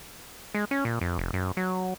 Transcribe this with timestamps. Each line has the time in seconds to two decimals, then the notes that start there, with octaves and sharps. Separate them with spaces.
0.55 G#3
0.71 C#4
0.85 A#2
1.01 F2
1.18 F1
1.33 F#2
1.57 F#3